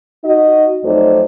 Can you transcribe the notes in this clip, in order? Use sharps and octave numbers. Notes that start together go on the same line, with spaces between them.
D#4 F#4 D#5
F2 F#3 A3 D#4 C5 D5